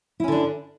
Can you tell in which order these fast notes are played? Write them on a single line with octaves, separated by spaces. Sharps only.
E4 C#4 D3 D4